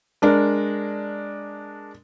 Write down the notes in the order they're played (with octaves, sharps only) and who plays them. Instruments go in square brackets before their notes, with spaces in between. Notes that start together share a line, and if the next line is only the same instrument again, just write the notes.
[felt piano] G#3 D4 A#4